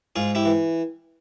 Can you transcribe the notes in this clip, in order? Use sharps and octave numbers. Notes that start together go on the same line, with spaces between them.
G#2 F4 G#4
E4 G4
E3